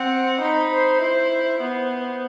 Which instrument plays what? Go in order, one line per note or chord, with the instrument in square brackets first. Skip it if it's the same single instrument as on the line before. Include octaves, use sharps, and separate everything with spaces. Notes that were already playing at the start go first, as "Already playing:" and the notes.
Already playing: [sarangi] C4 [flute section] F#5
[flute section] C5
[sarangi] D#4 [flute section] B5
[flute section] C5
[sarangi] E4 [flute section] C5
[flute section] C5
[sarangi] B3 [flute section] C5
[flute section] C5